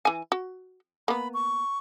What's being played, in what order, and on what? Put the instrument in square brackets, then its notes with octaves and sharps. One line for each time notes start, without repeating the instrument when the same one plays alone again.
[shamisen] E3 G#5
F#4
[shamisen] A#3 B3 [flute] B5
[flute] C#6